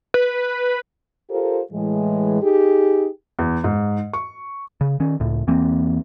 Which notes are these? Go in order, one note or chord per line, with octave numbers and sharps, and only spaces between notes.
B4
F4 G4 A4 A#4 C5
A2 E3 G#3
D#4 G4 G#4
E2
G#2
C#6
C#3
D#3 C#4
C#2 A2
E2 E3 A#3 C4